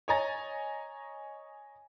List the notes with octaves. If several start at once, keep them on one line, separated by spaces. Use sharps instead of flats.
C#5 D#5 G#5 A#5 A6